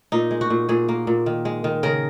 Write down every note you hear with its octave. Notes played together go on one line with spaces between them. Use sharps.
A#2 D#4
G#3
F#4
A#2
A#2 G#4
A#3
A#2
D#3
G#3
D#3
C#3 A#4